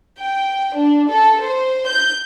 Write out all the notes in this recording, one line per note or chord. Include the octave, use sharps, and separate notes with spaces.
G5
D4
A4
C5
G6